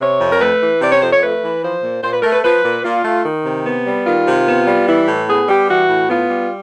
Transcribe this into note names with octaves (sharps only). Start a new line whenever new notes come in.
C3 C#5
F2
A#4
A3 B4
E3
C3 D5
C#5
F2 C5
C#5
A3 B4
E3
F3 C5
A#2
A#2 C5
B4
A3 A#4
B4
F3 B4
A#2
A#2 F4
A3
D#3
C3
B3
G3
D#3 F4
C3
B3
G3
E3 E4
A2
B3 G#4
G3 G4
E3 F#4
A2
B3 F4
G3